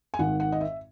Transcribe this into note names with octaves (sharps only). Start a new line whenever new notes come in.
G#5
G#1 G#2 D#3 F#5
F#5
D#5
E5